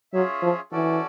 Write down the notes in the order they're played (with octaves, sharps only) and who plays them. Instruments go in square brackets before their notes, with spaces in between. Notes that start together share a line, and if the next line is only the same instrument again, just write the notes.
[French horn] F#3 [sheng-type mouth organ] C#4 F4 G#4 C#5 E5
[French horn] F3
[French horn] E3 [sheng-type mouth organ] C#4 F#4 A4 D5